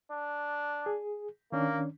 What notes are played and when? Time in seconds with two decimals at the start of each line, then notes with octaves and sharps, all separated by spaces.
0.12 D4
0.86 G#4
1.52 D#3 A#3 C#4 D4